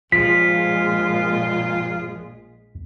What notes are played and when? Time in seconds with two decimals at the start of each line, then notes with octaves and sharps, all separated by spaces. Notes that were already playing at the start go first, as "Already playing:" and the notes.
0.12 A#1 G2 A#2 F3 G#3 F4 B6